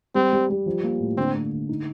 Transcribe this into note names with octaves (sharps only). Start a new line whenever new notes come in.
G3 C4
G3
G3
F3
A#3
A2
D3 C4
A3
D3
D#4